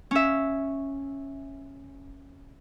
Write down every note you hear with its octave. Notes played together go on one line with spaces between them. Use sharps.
C#4 E5